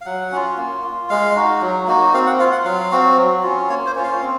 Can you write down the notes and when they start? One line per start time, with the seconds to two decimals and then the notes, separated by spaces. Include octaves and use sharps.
0.01 F5
0.06 F#3 F#5
0.32 C#4 F4
0.58 A#3
0.84 F4
1.09 G#3 F5
1.36 D#4 F#4
1.61 F#3
1.87 A#3 D#4 F#4
2.13 C4 F5
2.27 F#5
2.39 F4 F5
2.52 F#5
2.65 F#3 F5
2.91 C4 F#4
3.17 F#3
3.43 C#4 F4
3.69 A#3 C#5
3.86 C5
3.95 C#4 F4
4.04 F5
4.21 C4